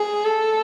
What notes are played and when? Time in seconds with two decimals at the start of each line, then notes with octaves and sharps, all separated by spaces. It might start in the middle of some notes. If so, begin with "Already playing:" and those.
Already playing: G#4
0.25 A4